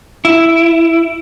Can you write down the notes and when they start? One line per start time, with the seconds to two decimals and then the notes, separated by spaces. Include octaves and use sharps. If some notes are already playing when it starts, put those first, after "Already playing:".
0.25 E4